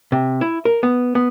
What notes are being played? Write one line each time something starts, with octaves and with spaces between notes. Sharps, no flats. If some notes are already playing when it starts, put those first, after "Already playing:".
C3
E4
A#4
B3
B3